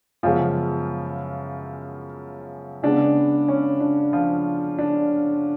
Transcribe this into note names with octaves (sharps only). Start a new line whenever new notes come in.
F#2 C#3 F3 G#3 B3 F4
C#3 G#3 B3 D4
C#4
D4
F3 F4
D4